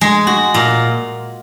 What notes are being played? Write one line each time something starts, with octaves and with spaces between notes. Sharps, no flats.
G#3
F#4
A#2